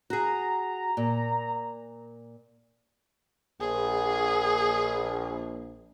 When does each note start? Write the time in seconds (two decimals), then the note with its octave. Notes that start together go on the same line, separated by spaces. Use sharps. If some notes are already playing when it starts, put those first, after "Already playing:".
0.10 F#4 G#4 A#5
0.97 A#2
3.60 A#1 G#4